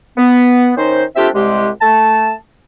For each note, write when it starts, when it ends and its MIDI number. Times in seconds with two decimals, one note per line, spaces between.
0.17 0.72 59
0.77 1.03 51
0.77 1.03 61
0.77 1.03 63
0.77 1.03 72
1.16 1.28 57
1.16 1.28 60
1.16 1.28 62
1.16 1.28 65
1.16 1.28 67
1.16 1.28 76
1.35 1.69 36
1.35 1.69 56
1.35 1.69 67
1.82 2.33 57
1.82 2.33 81